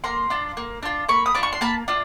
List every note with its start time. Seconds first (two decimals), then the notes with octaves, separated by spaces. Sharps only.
0.04 A#3 A#5 C6
0.30 D4 F4
0.57 A#3
0.83 D4 F4
1.09 A#3 B5 C#6
1.26 D#6
1.35 D4 F4 D6
1.43 C#6
1.53 C6
1.61 A#3 A5 B5
1.88 D4 F4